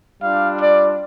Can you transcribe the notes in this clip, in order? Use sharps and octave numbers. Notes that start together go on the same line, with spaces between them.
G3 D4 F4 F5
D5